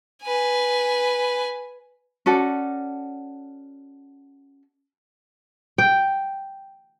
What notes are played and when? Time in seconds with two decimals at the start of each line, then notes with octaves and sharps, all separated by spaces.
0.23 B4 G#5
2.26 C#4 F#4 A4 D5
5.78 G5